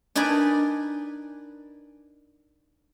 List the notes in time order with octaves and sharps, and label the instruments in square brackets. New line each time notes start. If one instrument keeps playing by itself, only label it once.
[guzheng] D4 D#4 A#4 B4 D5 G#5